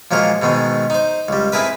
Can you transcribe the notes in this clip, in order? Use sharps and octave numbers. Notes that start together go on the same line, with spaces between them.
A#2 F3 F#3 G#3 A#4
G#2 B2 D#3 G#3
D#4 C5
C#2 G3
C4 E4 G#4 A#4 B4